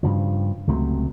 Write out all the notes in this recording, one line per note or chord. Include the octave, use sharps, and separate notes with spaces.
G2 C#3 F3
C#2 C3 F#3 A3